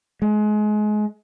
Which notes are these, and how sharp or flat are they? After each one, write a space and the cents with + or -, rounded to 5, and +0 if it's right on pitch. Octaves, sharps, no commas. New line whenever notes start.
G#3 +30